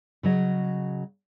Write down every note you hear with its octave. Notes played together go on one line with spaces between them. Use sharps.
C#3 F#3 D#5